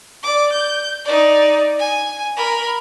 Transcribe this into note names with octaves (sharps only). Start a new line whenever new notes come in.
D5 D6
G6
D#4 D5
G#5
A#4 B5